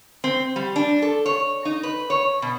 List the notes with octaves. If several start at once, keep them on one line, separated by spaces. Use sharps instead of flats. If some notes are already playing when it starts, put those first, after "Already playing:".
C4
G3
D4
A4
C#5
D#4
B4
C#5
B2